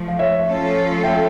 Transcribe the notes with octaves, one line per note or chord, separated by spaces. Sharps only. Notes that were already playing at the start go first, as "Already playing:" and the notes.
Already playing: F3 A3
F5
C#5 E5
F3 A3 C#4 F4 A4
E5 G5